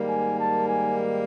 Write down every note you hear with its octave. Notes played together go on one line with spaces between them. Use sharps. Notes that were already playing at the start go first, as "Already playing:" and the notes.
Already playing: G#2 D#3 G3 A#3
G#5
A5
G#5